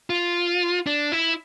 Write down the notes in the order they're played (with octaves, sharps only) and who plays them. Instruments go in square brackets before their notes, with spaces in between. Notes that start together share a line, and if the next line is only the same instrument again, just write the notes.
[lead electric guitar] F4
D4
E4